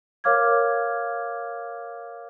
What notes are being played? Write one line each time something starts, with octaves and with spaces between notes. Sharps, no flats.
A#4 C#5 F5 D6 F6 G#6